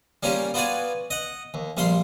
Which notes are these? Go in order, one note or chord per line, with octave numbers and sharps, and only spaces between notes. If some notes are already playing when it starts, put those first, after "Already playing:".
G3 A#3 C#4 F4 G4
B3 F4 F#4 D5 G#5
D#5 F#5
D#2
A#1 G3 F5 C6